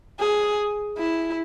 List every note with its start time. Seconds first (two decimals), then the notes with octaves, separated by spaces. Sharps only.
0.20 G#4
0.98 E4